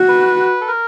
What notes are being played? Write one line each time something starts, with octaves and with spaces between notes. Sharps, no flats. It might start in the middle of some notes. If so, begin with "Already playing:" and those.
Already playing: F#4
B4
A4
A#4